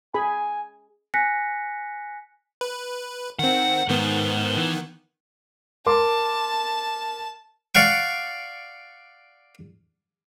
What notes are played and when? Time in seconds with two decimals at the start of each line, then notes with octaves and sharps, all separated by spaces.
0.14 G#4 G#5 B5
1.14 G#5 F#6 A#6 B6 C#7
2.61 B4
3.39 D#3 C4 F#5
3.88 G#2 D#3 B3
4.56 E3
5.86 A#4 A5 C6 D6
7.75 D5 F5 F#5 C#6